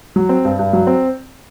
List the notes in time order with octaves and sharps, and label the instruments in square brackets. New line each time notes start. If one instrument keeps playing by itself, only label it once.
[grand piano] F#3
C4
G2
G2
F#3
C4